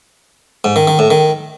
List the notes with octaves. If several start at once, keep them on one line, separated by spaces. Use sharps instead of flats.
G#2
D#3
D#3
A2
D#3